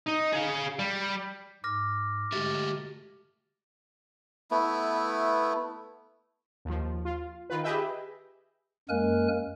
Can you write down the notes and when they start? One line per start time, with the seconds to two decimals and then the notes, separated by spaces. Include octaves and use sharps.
0.07 D#4
0.33 G#4 F5
0.79 G3
1.64 G#2 D6 F6 A#6
2.32 D3 G#3 A3 F#4 G4 E5 A6
4.51 A3 B3 E4
6.65 D#2 F3
7.05 F4
7.50 D#3 F4 B4
7.64 G4 G#4 B4 D#5 E5 G5
8.89 F#2 G#3 A#3 A#4 G#5 F#6